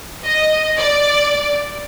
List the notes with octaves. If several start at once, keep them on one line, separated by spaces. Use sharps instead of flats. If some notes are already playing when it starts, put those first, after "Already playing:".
D#5
D5